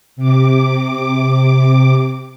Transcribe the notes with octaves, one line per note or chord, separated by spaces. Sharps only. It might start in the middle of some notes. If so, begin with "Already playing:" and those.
C3 D6